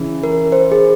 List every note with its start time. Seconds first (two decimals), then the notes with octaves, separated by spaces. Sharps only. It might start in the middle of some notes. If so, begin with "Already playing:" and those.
Already playing: C#3 E3
0.24 A#4
0.52 C5
0.72 G#4